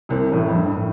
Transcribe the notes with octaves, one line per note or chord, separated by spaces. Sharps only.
C2 C3
A1 A2
F2
G2
A2